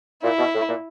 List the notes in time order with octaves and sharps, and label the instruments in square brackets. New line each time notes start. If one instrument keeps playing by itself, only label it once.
[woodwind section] A#2 [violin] E4
[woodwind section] B2
A2
A#2